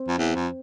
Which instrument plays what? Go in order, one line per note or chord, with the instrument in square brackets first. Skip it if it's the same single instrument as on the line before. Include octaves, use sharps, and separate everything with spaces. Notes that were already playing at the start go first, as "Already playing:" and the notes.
Already playing: [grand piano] C4
[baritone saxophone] F2
E2
F2